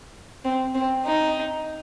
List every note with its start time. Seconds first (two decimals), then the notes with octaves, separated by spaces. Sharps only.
0.45 C4
0.74 C4
1.05 D#4